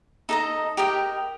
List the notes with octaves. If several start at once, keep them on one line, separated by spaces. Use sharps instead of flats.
D#4 A4 D#5 A#5
G4 A#4 D#5 G5